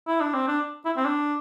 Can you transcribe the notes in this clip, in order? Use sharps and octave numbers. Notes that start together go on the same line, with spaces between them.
E4
D4
C4
D4
E4
C4
D4